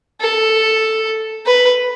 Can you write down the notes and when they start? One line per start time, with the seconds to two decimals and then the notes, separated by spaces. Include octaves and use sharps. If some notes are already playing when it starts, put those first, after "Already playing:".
0.21 A4
1.46 B4